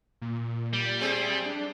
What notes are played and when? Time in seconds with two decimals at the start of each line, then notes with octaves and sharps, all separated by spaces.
0.21 A#2
0.73 G3
1.00 A3 C4 G#4
1.46 D4